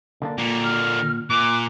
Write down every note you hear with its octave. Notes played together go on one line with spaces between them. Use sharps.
D3 A#3 D4
A#2 D3 A#3
F6
A#2 D6 F#6